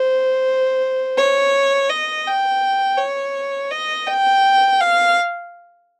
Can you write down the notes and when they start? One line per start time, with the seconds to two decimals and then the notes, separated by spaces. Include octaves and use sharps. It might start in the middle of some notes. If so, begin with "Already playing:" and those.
Already playing: C5
1.17 C#5
1.90 D#5
2.27 G5
2.99 C#5
3.71 D#5
4.07 G5
4.81 F5